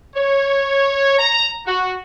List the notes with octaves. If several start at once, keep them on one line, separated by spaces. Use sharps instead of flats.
C#5
A#5
F#4